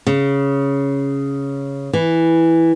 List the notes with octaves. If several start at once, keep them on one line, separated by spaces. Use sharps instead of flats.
C#3
E3